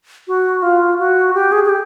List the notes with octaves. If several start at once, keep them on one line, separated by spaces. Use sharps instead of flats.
F#4
F4
F#4
G4
G#4
G#4
G4